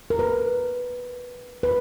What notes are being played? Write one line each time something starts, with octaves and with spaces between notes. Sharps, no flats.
A#4
B4
B4